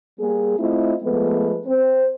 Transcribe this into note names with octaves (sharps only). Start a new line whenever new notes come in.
G3 A#3 G#4
A3 C4 E4 F4 D#5
F3 G#3 A3 B3 B4
C4 C5